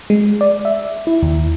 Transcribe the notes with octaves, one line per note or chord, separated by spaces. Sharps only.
G#3
D5
E5
E4
D#2